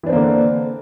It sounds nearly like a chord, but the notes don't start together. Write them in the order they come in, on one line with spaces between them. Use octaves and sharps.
E3 D4 C4 A#3 D3